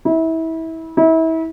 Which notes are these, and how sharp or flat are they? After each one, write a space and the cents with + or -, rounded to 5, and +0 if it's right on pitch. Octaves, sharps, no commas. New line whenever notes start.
E4 -25
E4 -30